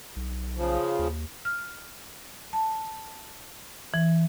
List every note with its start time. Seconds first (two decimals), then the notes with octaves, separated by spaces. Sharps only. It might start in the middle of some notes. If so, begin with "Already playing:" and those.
0.16 B1
0.57 C#3 F3
0.99 D#2
1.45 F6
2.53 A5
3.94 E3